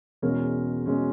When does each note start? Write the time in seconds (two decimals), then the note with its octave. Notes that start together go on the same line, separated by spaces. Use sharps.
0.22 E2 B2 G#3 C#4 A#4 C#5
0.86 B2 G#3 C#4